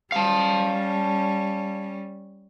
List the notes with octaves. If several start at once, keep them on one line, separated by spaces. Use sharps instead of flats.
G3 C#4 F5 A5